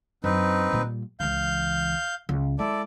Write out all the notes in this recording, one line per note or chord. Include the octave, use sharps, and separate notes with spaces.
F#2 C4 D4 D#4 B4
A#2 G3
C#2 E3 F5 G6
C#2
G#3 E4 A4 D5